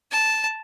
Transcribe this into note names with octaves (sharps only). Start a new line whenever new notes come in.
A5